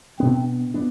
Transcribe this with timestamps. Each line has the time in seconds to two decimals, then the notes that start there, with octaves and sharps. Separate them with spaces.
0.19 B2 B3 C4 D4
0.74 B3 D4